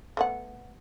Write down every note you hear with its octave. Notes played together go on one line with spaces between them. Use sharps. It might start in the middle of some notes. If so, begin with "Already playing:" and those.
A3 B3 F#5